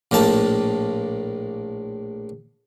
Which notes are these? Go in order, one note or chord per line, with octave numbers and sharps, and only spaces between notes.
A#1 A2 A#3 A5